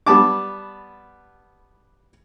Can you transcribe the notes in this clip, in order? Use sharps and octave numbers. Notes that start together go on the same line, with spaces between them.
G3 B3 A5 D6